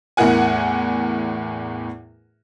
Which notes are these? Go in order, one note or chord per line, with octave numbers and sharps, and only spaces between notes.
E2 A2 E4 A#4 F#5 G#5